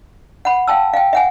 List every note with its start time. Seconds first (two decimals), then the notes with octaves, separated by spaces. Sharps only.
0.45 F#5 B5
0.68 F5 G5 A5 E6
0.93 F5 G5
1.13 E5 F#5 G#5